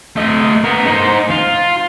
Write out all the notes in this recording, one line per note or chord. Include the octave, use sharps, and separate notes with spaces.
A3 D#5
B3 A#4
D#4 C5
F4